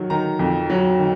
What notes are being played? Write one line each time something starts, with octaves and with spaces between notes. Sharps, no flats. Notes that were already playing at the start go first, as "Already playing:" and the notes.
Already playing: D#3 F#3
D#3 A#5
F2
F#3
D#3